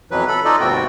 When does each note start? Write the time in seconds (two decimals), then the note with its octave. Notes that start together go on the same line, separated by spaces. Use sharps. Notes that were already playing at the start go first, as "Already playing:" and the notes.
0.11 F2 B2 E3 F#3 B4
0.28 A4 B5
0.45 D#4 F4 A4 D5 D#5
0.61 D#2 G#2 C3 B3 F#4 G5